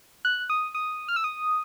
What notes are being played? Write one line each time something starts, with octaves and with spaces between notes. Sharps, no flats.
F#6
D#6
D#6
F6
E6
D#6